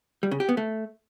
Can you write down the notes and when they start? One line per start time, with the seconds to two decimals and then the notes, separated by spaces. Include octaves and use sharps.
0.23 G3
0.31 C#3
0.40 G4
0.49 B3
0.57 A3